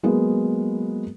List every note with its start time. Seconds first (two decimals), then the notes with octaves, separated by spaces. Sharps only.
0.03 F#3 G#3 A#3 B3